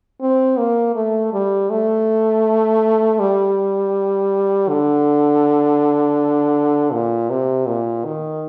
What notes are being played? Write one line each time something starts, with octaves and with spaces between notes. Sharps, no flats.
C4
A#3
A3
G3
A3
G3
D3
A#2
C3
A#2
D#3